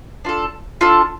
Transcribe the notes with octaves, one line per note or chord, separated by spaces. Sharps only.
D4 F4 A4
D4 F4 A4